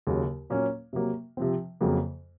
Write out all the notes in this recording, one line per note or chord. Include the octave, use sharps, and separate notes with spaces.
D#2 C#3 F#3
A#2 F#3 A#3 C#4
C3 F#3 A#3
C3 F3 C4
F2 C#3 F#3 A#3